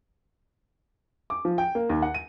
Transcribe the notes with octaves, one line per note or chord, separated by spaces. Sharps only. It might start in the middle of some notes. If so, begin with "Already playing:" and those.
D6
F3
G5
A#3
D#2
F#5
D#7